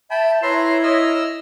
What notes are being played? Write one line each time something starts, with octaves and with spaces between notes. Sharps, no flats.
E5 G5 A5 B5
E4 B4 C#5 E5 A#5 C6
D#5 E6 F6